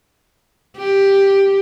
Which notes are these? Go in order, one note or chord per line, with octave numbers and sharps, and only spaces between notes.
G4